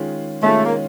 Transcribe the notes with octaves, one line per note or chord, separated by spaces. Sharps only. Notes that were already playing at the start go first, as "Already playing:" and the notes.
Already playing: D#3 G#3 C#4 F4
D#3 G#3 A3 C#4 F4
A#3